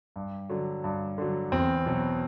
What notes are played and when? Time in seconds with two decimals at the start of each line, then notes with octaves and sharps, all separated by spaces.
0.16 G2
0.49 D3 F#3
0.84 G2
1.18 D3 F#3
1.52 E2 C4
1.86 B2 F#3